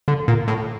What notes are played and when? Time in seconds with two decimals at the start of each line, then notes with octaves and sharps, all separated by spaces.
0.08 D3
0.28 A#2
0.48 A2